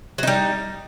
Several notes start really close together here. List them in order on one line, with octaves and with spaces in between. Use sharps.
F#3 D#4 G3